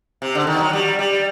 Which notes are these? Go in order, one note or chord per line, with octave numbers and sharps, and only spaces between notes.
C3
D3
D#3
F#3
G3
G3